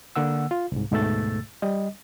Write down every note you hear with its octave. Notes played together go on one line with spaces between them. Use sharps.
D3 A#3 F#5 E6
F4
C2 G#2
D2 G#2 B2 A3 E6 A6
G3 D#5